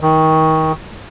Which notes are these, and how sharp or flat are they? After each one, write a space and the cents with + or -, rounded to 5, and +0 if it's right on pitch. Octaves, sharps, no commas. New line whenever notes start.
D#3 +25